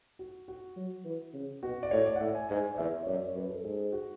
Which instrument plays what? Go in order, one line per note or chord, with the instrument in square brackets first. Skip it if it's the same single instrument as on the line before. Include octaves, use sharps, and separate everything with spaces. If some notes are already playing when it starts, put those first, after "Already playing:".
[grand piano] F#4
F#4
[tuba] F#3
E3
C#3
[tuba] B2 [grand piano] F#4
[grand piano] D5
[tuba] A2 [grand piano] C#5
[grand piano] D5
F#5
[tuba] A2 [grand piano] E5
[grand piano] G#5
[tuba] G#2 [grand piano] G#5
[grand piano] D5
[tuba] E2 [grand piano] E5
[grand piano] C#5
[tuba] F#2 [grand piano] D5
[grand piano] C#5
[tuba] F#2 [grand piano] B4
[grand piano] A4
[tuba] G#2 [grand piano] G#4
[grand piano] F#4